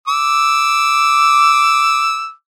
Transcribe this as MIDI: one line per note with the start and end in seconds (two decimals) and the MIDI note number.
0.07 2.32 86
0.07 2.32 88